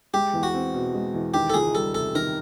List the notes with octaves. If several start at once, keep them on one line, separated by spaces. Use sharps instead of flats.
G#3 G4
E2
F#4
C4
B2
G#3
E2
D#3 G4
A4
C#2 G#4
G3 A4
C3 A4
D#3 A#4